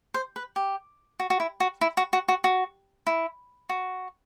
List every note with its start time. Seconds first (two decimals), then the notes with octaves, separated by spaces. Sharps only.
0.14 C5
0.36 B4
0.56 G4
1.19 F#4
1.30 F#4
1.40 E4
1.60 F#4
1.81 E4
1.97 F#4
2.13 F#4
2.28 F#4
2.44 F#4
3.07 E4
3.69 F#4